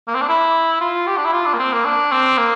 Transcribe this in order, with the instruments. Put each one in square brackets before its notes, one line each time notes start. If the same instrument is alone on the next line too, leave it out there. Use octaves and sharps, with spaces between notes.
[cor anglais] A#3
C4
D4
E4
F4
G4
D4
E4
F4
D4
A#3
C4
A#3
D4
C4
A#3